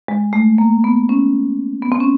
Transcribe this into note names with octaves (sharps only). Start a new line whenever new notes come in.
G#3
A3
A#3
B3
C#4
B3
C4
C#4